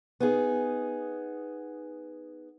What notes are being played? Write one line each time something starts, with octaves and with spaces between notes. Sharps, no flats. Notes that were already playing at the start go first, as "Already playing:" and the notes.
B3 D#4 G#4